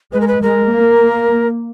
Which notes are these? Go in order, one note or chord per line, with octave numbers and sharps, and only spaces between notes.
G#3 B4
A#4
B4
G#3 A#4
A#3